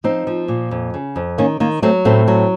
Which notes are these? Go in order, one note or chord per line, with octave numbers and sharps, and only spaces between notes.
F3 C4 D#4
F3
A#2
F2
C#3
F2
D#3 A#3 C#4
D#3 A#3
F#3 A3 C4
A2 A3 C4
F#3